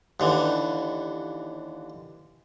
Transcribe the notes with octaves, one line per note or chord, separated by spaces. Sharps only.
D#2 D3 E3